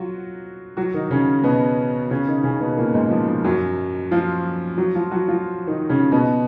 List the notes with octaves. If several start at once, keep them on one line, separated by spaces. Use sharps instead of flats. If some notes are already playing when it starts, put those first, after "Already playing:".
Already playing: F#3 F4 F#4
F#3 F#4
D#3 D#4
C#3 C#4
B2 B3
C#3 C#4
D#3 D#4
C#3 C#4
B2 B3
A#2 A#3
G#2 G#3
F3
F3
F#2 F#3
F3 F4
F#3 F#4
F3 F4
F#3 F#4
F3 F4
D#3 D#4
C#3 C#4
B2 B3